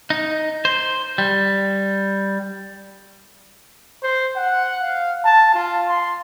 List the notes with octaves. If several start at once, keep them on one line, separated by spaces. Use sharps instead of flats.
D#4
C5
G3
C5
F#5
F5
A5
F4
C6